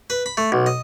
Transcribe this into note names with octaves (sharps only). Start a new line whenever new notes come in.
B4
B5
A3
B1
D#5